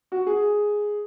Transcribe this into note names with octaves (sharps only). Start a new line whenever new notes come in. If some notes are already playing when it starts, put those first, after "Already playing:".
F#4
G#4